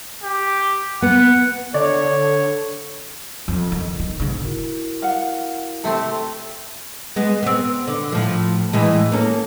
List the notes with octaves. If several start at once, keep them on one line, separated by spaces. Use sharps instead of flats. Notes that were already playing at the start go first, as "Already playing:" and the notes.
G4
B3 F#5
D3 A4 C#5 D5
F2
D#3
D#3
G#2 D3
E4 F#4 A#4
F5 F#5
C3 A3 C4 A4
G#3 B3
B3 C4
D3
A2 F3
A2 E3 G#3
A#3 C#4 A4